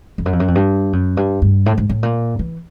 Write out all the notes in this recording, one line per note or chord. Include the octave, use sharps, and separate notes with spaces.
F2
F#2
F2
F#2
F2
G2
F#2
G2
G2
A2
G#2
A2
A#2
E3